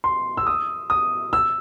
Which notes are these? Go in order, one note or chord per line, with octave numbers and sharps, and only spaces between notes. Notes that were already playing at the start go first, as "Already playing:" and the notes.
C6
E6
D#6
D#6
E6